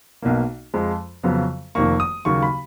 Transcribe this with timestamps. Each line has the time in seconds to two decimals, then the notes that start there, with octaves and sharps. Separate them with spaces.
0.22 B1 B2 A#3
0.74 F2 F3 G#3
1.23 F2 C#3 F#3 B3
1.75 F1 F2 D#3 A#3 C#6
2.00 D#6
2.25 D#2 C#3 F#3 A#3 C#6
2.42 B5